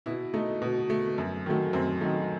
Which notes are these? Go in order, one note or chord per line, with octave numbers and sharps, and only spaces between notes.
B2 E4
A3 D#4
B2
A3
F#2
D#3 F#3 A3
F#2 C4
D#3 F#3 A3 D#4